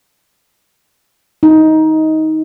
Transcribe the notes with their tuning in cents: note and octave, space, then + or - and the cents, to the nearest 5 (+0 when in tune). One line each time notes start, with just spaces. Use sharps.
D#4 +15